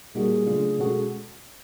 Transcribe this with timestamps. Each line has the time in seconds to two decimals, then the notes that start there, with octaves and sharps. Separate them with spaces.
0.15 A#2 G3 A#3 D#4 F#4 G#4
0.47 C#3 F#3 A3 D4 F4
0.79 B2 G#3 C#4 F#4 A4